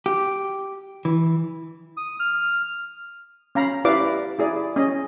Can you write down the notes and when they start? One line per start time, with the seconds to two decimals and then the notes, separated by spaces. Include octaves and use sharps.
0.06 G4
1.05 E3
1.97 D#6
2.20 F6
3.55 C#4 F5 A#5 B5
3.85 E4 G4 B4 D5 F5 D6
4.39 E4 G#4 D5
4.76 C#4 D#5